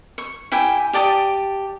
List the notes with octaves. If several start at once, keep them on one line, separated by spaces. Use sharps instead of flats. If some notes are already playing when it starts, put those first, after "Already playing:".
C#6
E4 G4 G5 G#5
G4 D5 A5 D#6